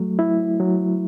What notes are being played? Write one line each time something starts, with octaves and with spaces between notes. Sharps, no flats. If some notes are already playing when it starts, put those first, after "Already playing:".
Already playing: F#3 A3
E4
F#3